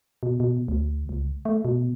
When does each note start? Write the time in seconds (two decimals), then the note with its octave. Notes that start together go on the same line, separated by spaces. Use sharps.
0.23 B2
0.40 B2
0.68 D2
1.09 C#2
1.45 A3
1.65 B2